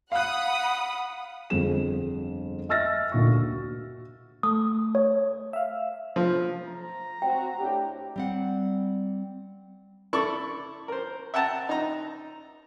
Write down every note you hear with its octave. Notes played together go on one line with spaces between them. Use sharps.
F5 F#5 B5 D#6 F#6
G1 F2 G#4 E7
D#5 E5 E6 F6 A6 A#6
D2 A#2 C#6
F#4
A3 D#6
C#5
E5 F5
F3
A#5
C4 F#4 G5
A2 D4 G4
G3 C4 F#5
E4 A4 D5 C#6 D6
A#4 C5
E5 F#5 G5 A5 A#5
D#4 A#5